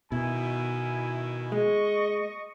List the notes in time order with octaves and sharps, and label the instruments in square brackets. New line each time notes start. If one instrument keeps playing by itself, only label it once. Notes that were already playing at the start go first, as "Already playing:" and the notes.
[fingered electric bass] B2 [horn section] D#3 E4 G#5
[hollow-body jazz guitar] G#3 [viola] D#5 C#6